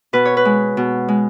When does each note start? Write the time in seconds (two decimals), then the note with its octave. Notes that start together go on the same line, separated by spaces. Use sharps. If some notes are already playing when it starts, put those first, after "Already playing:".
0.13 B2 B4
0.25 C#5
0.37 B4
0.45 G#3
0.77 B2
1.08 G#3